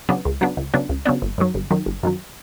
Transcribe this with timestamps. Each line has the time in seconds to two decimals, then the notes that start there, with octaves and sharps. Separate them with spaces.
0.09 C#3 F#3 B3 D4
0.25 C#2
0.41 C#3 F#3 B3 D4
0.57 C#2
0.74 C#3 F#3 B3 D4
0.89 C#2
1.05 C#3 F#3 B3 D4
1.22 G1
1.38 F#2 D#3 F#3
1.54 G1
1.71 F#2 D#3 F#3
1.86 G1
2.03 F#2 D#3 F#3